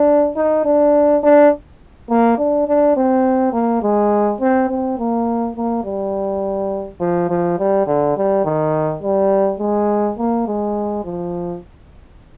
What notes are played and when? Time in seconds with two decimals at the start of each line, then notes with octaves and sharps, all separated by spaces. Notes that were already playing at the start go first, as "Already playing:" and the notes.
Already playing: D4
0.36 D#4
0.65 D4
1.23 D4
2.10 A#3
2.38 D4
2.68 D4
2.96 C4
3.53 A#3
3.83 G#3
4.40 C4
4.70 C4
4.99 A#3
5.56 A#3
5.84 G3
7.01 F3
7.29 F3
7.59 G3
7.87 D3
8.17 G3
8.45 D#3
9.02 G3
9.60 G#3
10.18 A#3
10.48 G#3
11.05 F3